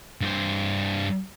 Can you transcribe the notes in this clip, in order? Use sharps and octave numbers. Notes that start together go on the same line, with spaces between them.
G2 C5